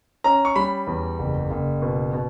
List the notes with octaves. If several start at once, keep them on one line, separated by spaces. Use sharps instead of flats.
C#4 A#5
C#6
G3 B5
E2
F#1
F#1
B2
B2